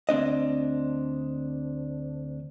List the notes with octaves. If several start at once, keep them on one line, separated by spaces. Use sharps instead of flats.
D2 C4 D4 D#5